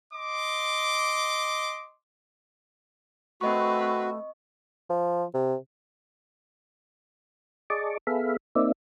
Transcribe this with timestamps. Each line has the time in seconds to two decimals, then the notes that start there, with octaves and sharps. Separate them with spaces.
0.14 D#5 C6 D6
3.41 A3 C4 F#4 B4 D#5 C#6
4.90 F3
5.34 C3
7.70 G#4 D5 D#5 A5 C#6 D6
8.07 B3 G#4 A4 E5 F5 B5
8.55 A#3 C4 D#4 D5 E5